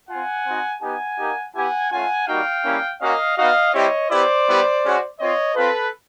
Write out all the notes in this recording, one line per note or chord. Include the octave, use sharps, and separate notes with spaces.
C4 F4 F#5 G#5
C4 D#4 F#4
B3 D#4 G4 F#5 G#5
A#3 D#4 G4
B3 E4 G4 F#5 G#5
A3 C#4 F4 F#5 G#5
G3 A#3 D#4 F#4 F5 G5
G3 A#3 C#4 E4
A#3 C#4 F#4 D#5 F5
B3 D#4 F#4 D#5 F5
G3 C4 E4 G4 C#5 D#5
B3 E4 G4 C5 D5
G3 B3 E4 G4
G#3 C#4 F#4
C4 F4 C#5 D#5
C4 F4 A4 B4